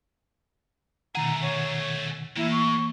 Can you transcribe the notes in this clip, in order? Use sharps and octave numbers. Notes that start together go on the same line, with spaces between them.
B2 D#3 A3 G#4 F#5 A#5
C#5
A2 E3 A#3 E4
C#6